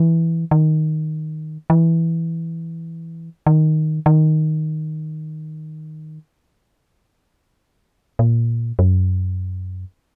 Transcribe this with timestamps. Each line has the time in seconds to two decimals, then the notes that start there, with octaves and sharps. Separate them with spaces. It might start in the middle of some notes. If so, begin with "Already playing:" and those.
Already playing: E3
0.51 D#3
1.70 E3
3.46 D#3
4.06 D#3
8.19 A#2
8.79 F#2